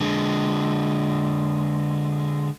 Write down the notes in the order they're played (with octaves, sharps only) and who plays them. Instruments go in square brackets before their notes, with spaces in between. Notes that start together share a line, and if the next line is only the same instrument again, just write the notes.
[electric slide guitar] D3 G#3